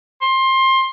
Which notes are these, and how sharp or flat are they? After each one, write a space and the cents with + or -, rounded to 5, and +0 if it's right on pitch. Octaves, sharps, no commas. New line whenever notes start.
C6 +20